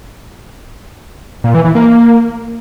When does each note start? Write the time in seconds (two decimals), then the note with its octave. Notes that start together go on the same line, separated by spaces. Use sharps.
1.44 A#2
1.54 E3
1.65 E3
1.75 A#3